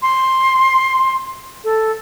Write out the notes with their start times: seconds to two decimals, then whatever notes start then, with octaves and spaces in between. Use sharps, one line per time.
0.02 C6
1.64 A4